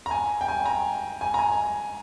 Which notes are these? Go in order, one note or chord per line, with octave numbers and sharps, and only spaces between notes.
A#5
G#5
G5
G#5
A#5
G#5
A#5
G#5